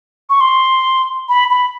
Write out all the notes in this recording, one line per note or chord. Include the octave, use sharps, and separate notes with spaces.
C#6
C6
B5
B5